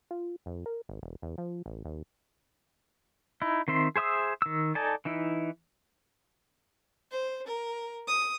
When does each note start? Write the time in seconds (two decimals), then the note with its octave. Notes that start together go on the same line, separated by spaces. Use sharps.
0.11 F4
0.46 F2
0.66 A#4
0.89 G#1
1.03 E1
1.22 E2
1.38 F3
1.66 A1
1.85 D#2
3.42 D#4 E4
3.68 D#3 C4 E5 C6
3.96 G#4 C5 E5 D#6 E6
4.42 D#3 E6
4.75 D#4 A4 D5 G#5 A5
5.05 E3 D#4 E4
7.11 C5
7.47 A#4
8.08 D#6